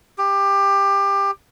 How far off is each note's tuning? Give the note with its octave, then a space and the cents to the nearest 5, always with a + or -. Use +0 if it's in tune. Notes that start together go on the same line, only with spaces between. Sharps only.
G4 +20